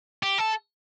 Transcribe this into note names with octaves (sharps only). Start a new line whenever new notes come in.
G4
A4